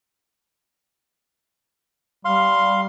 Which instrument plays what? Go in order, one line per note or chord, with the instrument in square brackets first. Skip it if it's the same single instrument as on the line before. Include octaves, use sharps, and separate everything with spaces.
[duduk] G3 [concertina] F5 C6